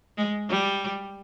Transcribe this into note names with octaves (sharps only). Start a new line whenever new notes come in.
G#3
G3